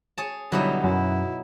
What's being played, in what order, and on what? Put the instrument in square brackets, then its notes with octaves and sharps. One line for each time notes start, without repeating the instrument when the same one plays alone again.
[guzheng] G#4 C#5 A5
[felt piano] B1 D3 G3 [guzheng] F#3 B3 D#4 [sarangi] E4
[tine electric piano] F#2 [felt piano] B2 [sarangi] E4